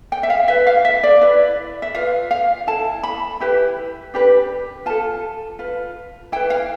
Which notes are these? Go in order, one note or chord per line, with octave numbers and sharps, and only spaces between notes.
G5
E5
F5
E4 B4 E5
F5
E5
D5
E4 B4
E5
F4 B4 F5
F5
E4 A4 A5
B5
E4 G4 B4
D4 G4 B4
F4 A4 A5
F4 B4
E4 B4 G5
F5